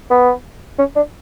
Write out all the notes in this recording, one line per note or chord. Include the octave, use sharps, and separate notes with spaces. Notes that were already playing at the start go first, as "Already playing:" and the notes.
B3
C#4
D4